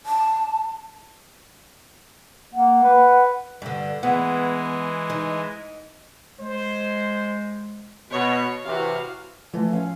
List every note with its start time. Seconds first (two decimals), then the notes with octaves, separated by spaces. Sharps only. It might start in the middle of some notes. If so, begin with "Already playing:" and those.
0.06 A5
2.54 A#3 F#5
2.83 B4
3.62 G2 D3
4.03 E3 G#3 B3
5.10 D#4
6.40 G#3 C5
8.10 B2 C#5
8.64 C3 E3 F#4 F5
9.54 E3 F3 A3
9.73 C#4 F5